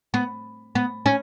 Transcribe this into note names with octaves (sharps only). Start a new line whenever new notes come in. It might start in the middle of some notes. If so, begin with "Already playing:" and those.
B3
B3
C#4